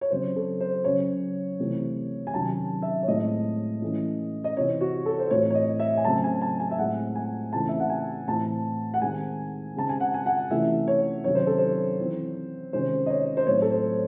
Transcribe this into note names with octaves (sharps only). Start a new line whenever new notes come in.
C#5
C#3 F#3 C4 C5
A4
C5
C#3 F#3 C#4 C#5
C3 E3 A3 C4
G#5
C3 D#3 F#3 C#4 A5
E5
C#5
A2 G#3 C4 D#5
E3 A3 C#4
D#5
C3 E3 C4 C#5
F#4
A4
C5
A2 E3 C4 C#5
C#5
D#5
E5
G#5
C#3 F#3 A3 C4 A5
G#5
A5
G#5
E5
A2 G#3 C4 F#5
G#5
C#3 E3 A3 C4 A5
E5
F#5
G#5
A2 E3 C4 A5
F#5
D#3 G#3 C4 G#5
C#3 G#3 C4 A5
G#5
F#5
G#5
F#5
C3 E3 A3 C#4 E5
C#5
C3 D#3 F#3 C#4 C#5
C5
A4
C5
E3 C4
C3 D#3 G#3 C#4 C5
D#5
C#5
C5
A2 F#3 C4 C#5
A4
C5